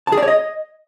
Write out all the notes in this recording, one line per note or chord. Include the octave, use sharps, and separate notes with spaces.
A5
G#4
D5
C#5
D#5